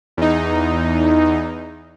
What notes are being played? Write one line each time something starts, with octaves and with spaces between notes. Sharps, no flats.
E2 D#4